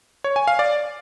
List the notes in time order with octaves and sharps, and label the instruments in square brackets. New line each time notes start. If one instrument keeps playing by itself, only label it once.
[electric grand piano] C#5
G#5
F5
D5